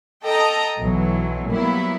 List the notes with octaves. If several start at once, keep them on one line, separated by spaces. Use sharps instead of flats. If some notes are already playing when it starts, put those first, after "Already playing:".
A4 D#5 G5 A5 A#5
B1 E3 F#3
F#3 G3 A#3 B3 E4